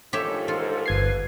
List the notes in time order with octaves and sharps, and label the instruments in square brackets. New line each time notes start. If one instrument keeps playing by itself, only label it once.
[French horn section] G#2 D#3 F3 [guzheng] G4 C#5 E5 [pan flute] A4
[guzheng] F4
[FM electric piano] G1 G#6 C7 [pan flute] B4